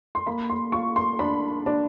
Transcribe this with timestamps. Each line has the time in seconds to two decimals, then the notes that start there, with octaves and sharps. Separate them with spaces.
0.15 C6
0.27 A#3 B5
0.50 C6
0.72 F4 C#6
0.96 C6
1.19 D4 B5
1.66 D4